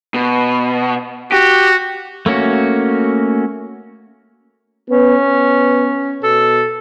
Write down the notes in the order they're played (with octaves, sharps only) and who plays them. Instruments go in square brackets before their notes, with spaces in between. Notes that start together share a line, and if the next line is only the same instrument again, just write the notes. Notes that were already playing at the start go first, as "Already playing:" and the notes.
[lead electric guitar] B2
[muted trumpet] F#4 [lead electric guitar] G4
[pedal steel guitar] A3 A#3 C#4 F#4
[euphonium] B3 [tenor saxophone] C#4
[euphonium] B3
[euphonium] B2 [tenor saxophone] A4